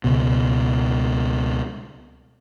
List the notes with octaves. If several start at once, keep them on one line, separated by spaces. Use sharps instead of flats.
C#2 B2